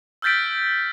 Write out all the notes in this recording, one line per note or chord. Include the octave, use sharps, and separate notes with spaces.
E6 F6 G6 A6 B6 D7